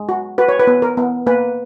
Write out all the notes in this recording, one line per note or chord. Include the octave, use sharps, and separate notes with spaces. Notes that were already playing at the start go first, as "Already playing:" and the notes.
Already playing: G#3
F#4
F#4 B4
C#5
B4
B3
A#4
B3
A#3 B4